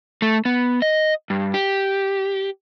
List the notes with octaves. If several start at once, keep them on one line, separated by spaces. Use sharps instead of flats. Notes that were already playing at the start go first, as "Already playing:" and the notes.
A3
B3
D#5
G2
G4